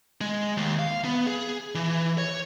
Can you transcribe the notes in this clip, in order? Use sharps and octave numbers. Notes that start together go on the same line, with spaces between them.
G#3
D#2
F5
B3
G#4
E3
C#5